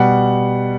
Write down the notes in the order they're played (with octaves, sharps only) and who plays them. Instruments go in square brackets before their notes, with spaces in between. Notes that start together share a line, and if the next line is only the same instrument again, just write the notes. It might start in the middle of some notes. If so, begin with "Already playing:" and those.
Already playing: [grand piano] B2 G3 F#5